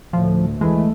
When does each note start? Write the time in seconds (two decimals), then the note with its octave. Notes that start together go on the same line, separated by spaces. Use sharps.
0.13 D2 A2 F3
0.61 E3 G#3 A3